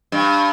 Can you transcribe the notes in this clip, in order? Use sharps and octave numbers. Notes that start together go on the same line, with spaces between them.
G2